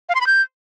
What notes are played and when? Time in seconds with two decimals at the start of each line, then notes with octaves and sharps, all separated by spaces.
0.09 F5
0.15 C6
0.21 B5
0.27 G6